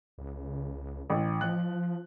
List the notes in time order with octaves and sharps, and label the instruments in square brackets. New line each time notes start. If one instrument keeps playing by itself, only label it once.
[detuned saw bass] C#2
[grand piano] A1
[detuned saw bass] F3 [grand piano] F#6